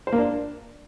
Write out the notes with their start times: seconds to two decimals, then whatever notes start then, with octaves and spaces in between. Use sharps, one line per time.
0.07 C5
0.12 A#3
0.18 D4